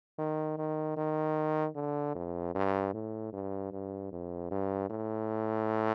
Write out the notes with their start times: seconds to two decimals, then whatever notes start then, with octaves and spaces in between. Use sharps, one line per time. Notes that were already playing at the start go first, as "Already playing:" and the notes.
0.19 D#3
0.58 D#3
0.97 D#3
1.75 D3
2.15 F2
2.55 G2
2.94 A2
3.33 G2
3.72 G2
4.12 F2
4.51 G2
4.90 A2